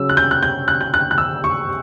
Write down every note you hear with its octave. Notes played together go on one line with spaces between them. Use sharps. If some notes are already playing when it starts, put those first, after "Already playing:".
Already playing: C#3 F#3 C#4 E6
F#6
G6
F#6
G6
F#6
G6
F#6
F#6
E6
C#6